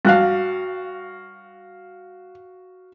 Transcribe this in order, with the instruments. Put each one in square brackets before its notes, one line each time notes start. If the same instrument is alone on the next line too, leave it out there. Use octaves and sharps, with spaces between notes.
[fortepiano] G2 F#6 [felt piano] F#4 F5